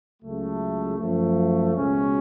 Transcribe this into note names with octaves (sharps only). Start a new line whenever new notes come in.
C#2 C#3 F#3 A3
F#2 F3 A3
C#2 B2 G#3 C#4 F#4